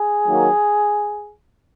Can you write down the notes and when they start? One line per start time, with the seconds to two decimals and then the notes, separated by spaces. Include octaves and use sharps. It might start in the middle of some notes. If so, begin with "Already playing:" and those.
Already playing: G#4
0.27 D#3 F#3 A#3